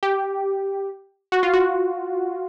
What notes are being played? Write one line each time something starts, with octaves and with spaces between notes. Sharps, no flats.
G4
F#4
F4
F#4